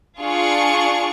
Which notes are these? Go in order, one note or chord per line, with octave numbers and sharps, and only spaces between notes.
D4 F4 G#4 C#6